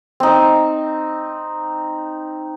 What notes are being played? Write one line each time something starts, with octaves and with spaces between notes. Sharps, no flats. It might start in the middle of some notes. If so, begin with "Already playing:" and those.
C4 D#4